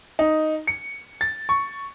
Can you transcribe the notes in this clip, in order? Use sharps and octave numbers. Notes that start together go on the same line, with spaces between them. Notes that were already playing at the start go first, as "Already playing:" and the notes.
D#4
C#7
A6
C#6